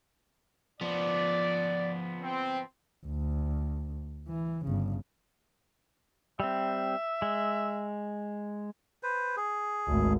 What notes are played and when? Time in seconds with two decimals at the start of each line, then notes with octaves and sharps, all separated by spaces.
0.81 F3 B3 D5
2.22 C4
3.05 D2
4.28 E3
4.65 G1 C#3
6.40 G3 C4 E5
7.22 G#3
9.03 B4 C5
9.36 G#4
9.87 G#1 D2